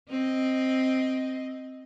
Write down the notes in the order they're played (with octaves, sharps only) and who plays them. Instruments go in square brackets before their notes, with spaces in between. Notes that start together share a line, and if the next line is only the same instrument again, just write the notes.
[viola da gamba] C4 D#5